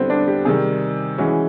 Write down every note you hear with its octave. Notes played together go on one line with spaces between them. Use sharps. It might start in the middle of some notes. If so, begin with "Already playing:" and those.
Already playing: D3 G3 B3 C4 E4
D4
G4
C3 D#3 G3 G#4
E3 G#3 C#4 E4 F#4